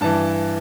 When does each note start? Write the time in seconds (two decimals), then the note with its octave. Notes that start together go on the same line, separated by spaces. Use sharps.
0.01 G2 E3 A5